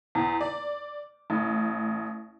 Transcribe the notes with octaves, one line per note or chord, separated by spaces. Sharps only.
E2
D5
A1